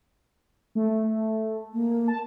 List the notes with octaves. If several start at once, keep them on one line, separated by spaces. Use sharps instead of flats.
A3
A#3
A5